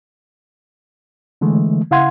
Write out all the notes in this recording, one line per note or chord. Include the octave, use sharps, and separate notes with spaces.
D3 E3 G#3 A3
C#3 E4 F5 F#5 C6 G#6